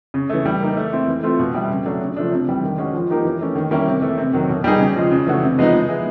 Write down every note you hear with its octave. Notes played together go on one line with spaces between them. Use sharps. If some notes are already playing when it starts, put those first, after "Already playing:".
C#3
E3 A3
G3
A#3 D#4
A3
C4 E4
E3
A3 C4 F4
B2
G3 B3 E4
C#3
F#3 A3 D4
C#3
F3 A3 D4
C3
E3 G3
D#3
G#3 C#4 F#4
F3
A#3 D#4 G4 A#4
E3
A3 C#4
D#3
G3 A#3 C#4 E4
C3
E3 A3
C3
D#3 F#3
B2
G3 B3 D#4 G#4
C#3
F3 G#3
C#3
E3 A3 D4 F#4
C3
F3 G#3 B3 D#4
G#3
B3 E4 G#4